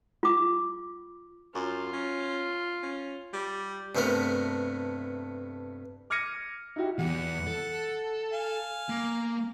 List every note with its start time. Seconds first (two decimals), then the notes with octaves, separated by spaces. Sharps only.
0.23 F4 D6
1.55 F#2 F4
1.93 C#4
2.82 C#4
3.33 G3
3.95 G2 C3 A3 B3 A#4
6.10 D6 F6 G#6 A#6 C#7 D#7
6.76 D#4 E4 F#4 G4
6.99 E2 F#5
7.47 A4
8.32 F5 G#5
8.89 A#3